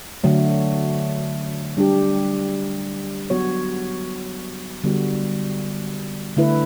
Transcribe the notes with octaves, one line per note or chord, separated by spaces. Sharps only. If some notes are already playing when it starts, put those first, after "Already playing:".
D3 F#3 A3
G3 D4 G4
F#3 B3 F#4 C#5
D3 G3 B3 F#4
D3 A3 E4 B4